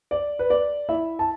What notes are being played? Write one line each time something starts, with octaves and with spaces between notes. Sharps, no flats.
D5
B4
D5
E4 E5
A5